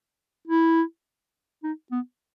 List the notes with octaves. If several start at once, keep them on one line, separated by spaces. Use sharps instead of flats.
E4
D#4
B3